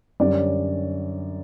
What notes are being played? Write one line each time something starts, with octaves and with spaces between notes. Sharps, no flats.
F#2 D3 G3 C#4 D5